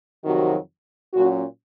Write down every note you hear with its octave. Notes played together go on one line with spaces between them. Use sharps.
F2 C3 D#3 F#3 F#4
A#2 F#3 C#4 F#4